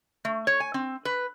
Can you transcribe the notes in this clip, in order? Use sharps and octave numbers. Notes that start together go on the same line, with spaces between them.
A3
C#5
G#5
C4
B4